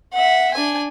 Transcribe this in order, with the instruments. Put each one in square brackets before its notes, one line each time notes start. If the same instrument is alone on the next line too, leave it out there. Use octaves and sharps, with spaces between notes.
[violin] E5 F#5
D4 G#5